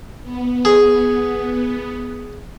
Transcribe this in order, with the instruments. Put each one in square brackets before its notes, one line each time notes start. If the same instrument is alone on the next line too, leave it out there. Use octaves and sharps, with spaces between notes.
[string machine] B3
[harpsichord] G#4